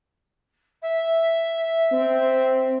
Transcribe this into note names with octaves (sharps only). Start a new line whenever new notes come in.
E5
C4